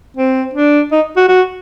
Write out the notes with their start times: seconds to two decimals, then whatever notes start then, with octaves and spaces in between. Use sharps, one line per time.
0.17 C4
0.54 D4
0.92 D#4
1.16 F#4
1.28 F#4